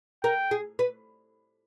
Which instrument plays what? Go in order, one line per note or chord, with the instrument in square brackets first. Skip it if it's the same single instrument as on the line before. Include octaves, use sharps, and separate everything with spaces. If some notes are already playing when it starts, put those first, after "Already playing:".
[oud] A#4 [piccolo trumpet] G5
[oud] G#4
B4